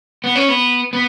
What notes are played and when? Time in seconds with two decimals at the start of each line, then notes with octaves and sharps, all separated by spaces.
0.24 B3
0.35 C#4
0.49 B3
0.93 B3